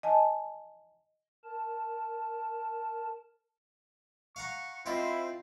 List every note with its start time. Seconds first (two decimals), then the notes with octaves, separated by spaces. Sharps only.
0.03 D#5 G#5 A5
1.44 A#4 A5
4.36 F5 F#5 A#5 C#6
4.86 C4 E4 F4 C5 D#5